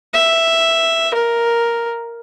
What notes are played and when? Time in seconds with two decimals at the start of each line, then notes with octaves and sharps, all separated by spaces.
0.14 E5
1.14 A#4